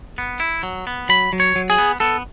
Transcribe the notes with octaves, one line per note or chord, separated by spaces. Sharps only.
B3
E4
F#3
B3
F#3 B5
F#3
C#5
F#3
G#4
B3
B3 A4